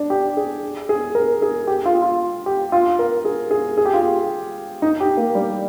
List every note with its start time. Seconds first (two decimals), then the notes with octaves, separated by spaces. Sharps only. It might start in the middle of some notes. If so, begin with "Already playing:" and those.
Already playing: D4
0.10 G4
0.37 G#4
0.89 G#4
1.15 A#4
1.42 G#4
1.67 G4
1.85 F4
2.02 F4
2.46 G4
2.72 F4
2.99 A#4
3.25 G#4
3.51 G#4
3.78 G#4
3.85 G4
3.94 F4
4.01 G4
4.82 D#4
5.00 G4
5.17 A#3
5.35 G3